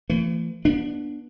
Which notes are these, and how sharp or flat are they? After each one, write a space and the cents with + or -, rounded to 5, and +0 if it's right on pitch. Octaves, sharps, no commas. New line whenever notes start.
E3 +40 A3 +45
B3 -30 D4 +0